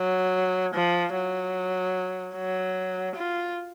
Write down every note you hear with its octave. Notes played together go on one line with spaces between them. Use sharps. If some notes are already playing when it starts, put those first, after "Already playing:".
Already playing: F#3
F3
F#3
F#3
F4